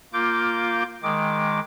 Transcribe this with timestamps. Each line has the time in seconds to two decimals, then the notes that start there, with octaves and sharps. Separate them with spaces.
0.13 A#3 F4 D6 G6
1.03 D#3 G#3 D6